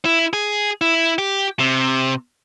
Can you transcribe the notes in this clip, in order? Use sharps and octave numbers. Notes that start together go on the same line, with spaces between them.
E4
G#4
E4
G4
C3